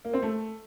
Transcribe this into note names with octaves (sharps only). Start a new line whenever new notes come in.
A#3
C4
A3